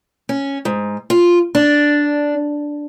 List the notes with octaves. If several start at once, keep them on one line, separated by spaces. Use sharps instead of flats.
C#4
G#2
F4
D4